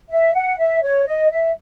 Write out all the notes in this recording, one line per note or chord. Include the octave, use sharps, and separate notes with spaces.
E5
F#5
E5
C#5
D#5
E5